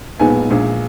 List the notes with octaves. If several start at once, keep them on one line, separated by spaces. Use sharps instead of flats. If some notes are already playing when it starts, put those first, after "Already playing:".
B1 A#2 G#3 B3 D#4 G#5
A#1 A#2 G#3